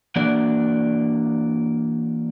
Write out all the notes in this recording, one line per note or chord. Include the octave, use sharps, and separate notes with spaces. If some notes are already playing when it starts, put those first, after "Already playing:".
E3 A#3 D4 F#4 D5